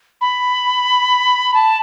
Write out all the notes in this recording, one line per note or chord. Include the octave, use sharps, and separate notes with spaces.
B5
A5